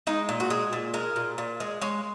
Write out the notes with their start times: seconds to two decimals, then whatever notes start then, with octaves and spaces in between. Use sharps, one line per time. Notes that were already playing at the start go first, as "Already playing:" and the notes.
0.07 G#3 D#4
0.29 A#2
0.40 F#4
0.50 G#3 G#4
0.73 A#2
0.94 G#3 A#4
1.16 A#2
1.38 A#2
1.60 G#3
1.82 G#3 C#5